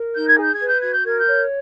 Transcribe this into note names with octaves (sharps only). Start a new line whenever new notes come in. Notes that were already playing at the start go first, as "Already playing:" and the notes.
Already playing: A#4
D#4 G6
G#6
G#4 G6
G#6
B4
G6
F#4 G#6
G6
A#4 G#6
G6
C#5